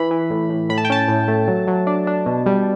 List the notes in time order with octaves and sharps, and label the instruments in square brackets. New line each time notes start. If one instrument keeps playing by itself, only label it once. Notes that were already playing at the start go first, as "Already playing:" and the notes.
Already playing: [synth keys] E3 B5
E3
A2
A2
A2 B5
A5
G5
C#4 A5
A2
A3
F#3
F#3
D4
D4
B2
G3